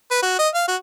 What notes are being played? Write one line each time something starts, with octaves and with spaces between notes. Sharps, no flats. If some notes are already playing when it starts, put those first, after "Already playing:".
B4
F#4
D#5
F5
F#4